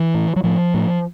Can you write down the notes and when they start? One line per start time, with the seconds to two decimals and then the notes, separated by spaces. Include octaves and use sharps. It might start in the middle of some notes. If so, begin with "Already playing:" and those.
Already playing: E3
0.14 A2
0.36 F#3
0.44 A2 F3
0.74 A2